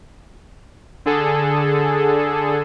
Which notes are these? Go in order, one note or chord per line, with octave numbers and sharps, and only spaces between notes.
D3 G#4 A4